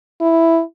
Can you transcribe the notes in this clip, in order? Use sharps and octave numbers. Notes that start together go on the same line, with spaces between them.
E4